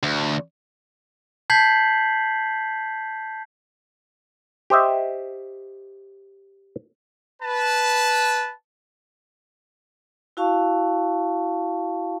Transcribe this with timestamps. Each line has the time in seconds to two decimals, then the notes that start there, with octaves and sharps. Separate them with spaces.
0.03 D2
1.50 A5 G6 G#6 B6 C7 F#7
4.70 G4 C5 D#5 E5
7.42 B4 A5
10.37 E4 F#4 F5 A5 C#6